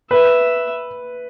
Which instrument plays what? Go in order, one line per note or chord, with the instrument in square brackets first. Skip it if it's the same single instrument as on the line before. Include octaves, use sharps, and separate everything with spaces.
[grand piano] B4 [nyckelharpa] E5